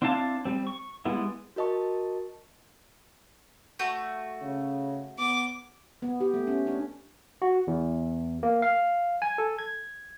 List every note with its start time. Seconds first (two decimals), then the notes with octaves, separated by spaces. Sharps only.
0.02 C4 D4 E4 F5 A5
0.45 G3 C4
0.67 C#6
1.05 G3 G#3 B3 E4
1.56 F#4 A#4 D#5 A5 C#6
3.79 A3 F#4 G6
4.42 C#3
5.19 B3 D6
6.02 B3
6.20 G4
6.34 A3
6.47 C#4
6.67 D4
7.42 F#4
7.67 E2
8.43 A#3
8.62 F5
9.22 G#5
9.38 A4
9.59 G#6